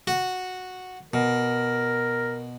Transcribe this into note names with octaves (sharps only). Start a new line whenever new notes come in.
F#4
B2 A#4